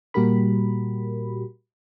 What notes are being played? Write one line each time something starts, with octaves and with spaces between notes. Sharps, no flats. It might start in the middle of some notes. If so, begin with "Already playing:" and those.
A#2 G3 F#4 G4 A#4 B5